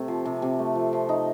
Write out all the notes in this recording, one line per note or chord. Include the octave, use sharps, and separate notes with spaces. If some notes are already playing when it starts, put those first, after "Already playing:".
Already playing: C3 A3
F3
C3
C3
A3
F3
F3
D#4